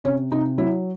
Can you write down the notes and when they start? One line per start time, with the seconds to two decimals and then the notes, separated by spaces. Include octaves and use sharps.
0.04 C3 C#4
0.31 C3 D#4
0.58 F#3 E4